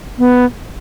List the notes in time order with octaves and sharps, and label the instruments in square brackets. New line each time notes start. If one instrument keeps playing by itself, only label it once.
[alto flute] B3